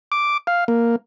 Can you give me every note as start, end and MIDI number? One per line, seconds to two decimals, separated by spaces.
0.12 0.37 86
0.47 0.64 77
0.68 0.96 58